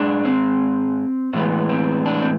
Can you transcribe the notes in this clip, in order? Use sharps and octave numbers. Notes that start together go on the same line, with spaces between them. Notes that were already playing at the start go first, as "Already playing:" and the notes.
Already playing: G#2 G#3 D4
C4
A2 E3 G#3 B3 C4
C4
D4
C4